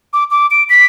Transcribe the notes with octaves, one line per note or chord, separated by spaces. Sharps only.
D6
D6
D7
B6